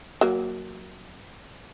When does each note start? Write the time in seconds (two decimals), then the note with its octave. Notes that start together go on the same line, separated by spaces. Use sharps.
0.21 F#3 A#3